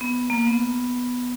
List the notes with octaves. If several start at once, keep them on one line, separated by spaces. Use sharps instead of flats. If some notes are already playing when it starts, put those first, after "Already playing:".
B3
A#3
B3